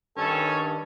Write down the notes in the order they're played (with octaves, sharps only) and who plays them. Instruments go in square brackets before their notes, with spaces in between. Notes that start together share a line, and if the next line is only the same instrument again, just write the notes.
[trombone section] G2 D#3 [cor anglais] C#4 [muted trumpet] A4